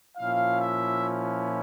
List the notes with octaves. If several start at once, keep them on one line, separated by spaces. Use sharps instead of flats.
A#2 F3 C#4 E4 F5
E5